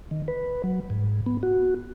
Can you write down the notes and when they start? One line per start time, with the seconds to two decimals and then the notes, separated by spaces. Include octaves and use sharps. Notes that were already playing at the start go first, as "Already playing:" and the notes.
0.11 D#3
0.28 B4
0.64 F#3
0.90 G#2
1.26 B3
1.43 F#4